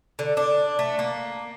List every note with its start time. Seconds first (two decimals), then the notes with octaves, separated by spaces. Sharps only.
0.19 D3
0.37 D4
0.79 A3
0.99 A#3